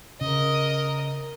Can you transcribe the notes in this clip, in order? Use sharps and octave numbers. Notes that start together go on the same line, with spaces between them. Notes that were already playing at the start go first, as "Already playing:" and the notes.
C#3 A#4 D#5